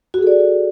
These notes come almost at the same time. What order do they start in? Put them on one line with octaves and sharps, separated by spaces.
F#4 G#4 A4 D5